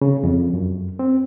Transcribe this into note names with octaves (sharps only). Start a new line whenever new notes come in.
C#3
F2
F#2
C4